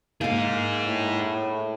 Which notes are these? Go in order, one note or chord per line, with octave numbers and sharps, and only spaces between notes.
A#3 D#4 G#4 F5
A2